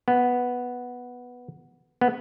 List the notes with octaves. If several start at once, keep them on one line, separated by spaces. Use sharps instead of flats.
B3
B3